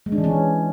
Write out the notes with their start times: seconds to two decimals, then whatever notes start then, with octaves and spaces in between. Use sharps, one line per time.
0.06 G#3
0.12 D4
0.18 E3
0.24 C#4